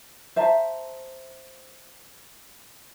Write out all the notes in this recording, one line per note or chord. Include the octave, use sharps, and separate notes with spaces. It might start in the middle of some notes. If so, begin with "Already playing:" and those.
C5 E5 A5 A#5